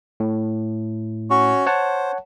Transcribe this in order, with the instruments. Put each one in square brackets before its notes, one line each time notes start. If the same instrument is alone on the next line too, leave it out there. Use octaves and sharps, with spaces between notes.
[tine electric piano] A2
[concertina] C#4 F#4 C#5
[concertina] C5 [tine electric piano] C#5 F#5 A5